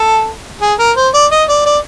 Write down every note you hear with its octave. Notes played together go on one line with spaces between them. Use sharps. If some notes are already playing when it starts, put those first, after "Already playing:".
Already playing: A4
G#4
A#4
C5
D5
D#5
D5
D5